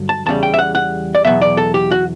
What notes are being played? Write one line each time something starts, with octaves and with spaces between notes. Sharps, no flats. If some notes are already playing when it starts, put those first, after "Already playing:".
Already playing: G2 D3 F#3
A5
E2 C#3 G3 A5
G5
E5
F#5
F#5
D5
E2 B2 F#3 E5
D5
A4
G4
F#4